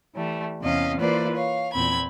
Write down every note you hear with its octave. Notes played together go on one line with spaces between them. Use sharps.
E3 G3 A3
E2 C3 C#4 D#5 F5
E3 A#3 F4 B4 C5 D5
C#5 F5
E2 A#2 C4 B5 G#6